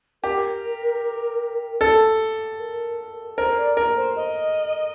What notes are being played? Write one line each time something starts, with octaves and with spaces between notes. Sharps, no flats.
G4 A#4
A4
A#4
A#4 C5
D5
A#4
C5
D#5